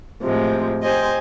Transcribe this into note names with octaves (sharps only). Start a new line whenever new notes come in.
A2 C3 F3 G#3
G4 C5 D#5 G#5